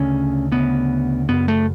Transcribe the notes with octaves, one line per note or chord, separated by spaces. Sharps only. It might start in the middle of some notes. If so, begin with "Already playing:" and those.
Already playing: D2 C#3 C#4
D2 C#3 B3
F#2 C#3 B3
A3